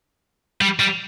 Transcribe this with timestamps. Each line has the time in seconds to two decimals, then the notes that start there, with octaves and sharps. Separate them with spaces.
0.61 G3
0.80 G3